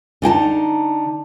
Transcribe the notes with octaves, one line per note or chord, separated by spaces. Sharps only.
D3 D#4 G5 A5